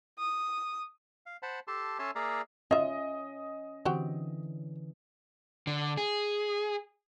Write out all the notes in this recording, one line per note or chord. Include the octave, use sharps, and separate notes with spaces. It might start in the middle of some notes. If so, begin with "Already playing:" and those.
D#6
F5
C5 F#5 A5 B5
G4 A4 A5 C6
C#4 A4 C#5 E5 A5 C6
A#3 G#4 D5 E5 F5 A#5
C#4 F4 D#5 E5
D3 E3 C4 F#4 G4
D3
G#4